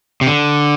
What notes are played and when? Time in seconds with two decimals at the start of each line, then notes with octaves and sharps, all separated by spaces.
0.21 C3
0.27 D3